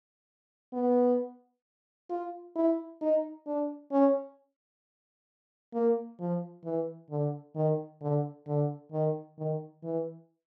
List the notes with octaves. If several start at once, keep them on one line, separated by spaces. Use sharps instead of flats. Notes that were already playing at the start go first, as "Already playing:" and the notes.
B3
F4
E4
D#4
D4
C#4
A#3
F3
E3
D3
D#3
D3
D3
D#3
D#3
E3